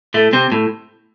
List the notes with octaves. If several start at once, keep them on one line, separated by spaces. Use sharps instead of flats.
A2 A3
C3 C4
A2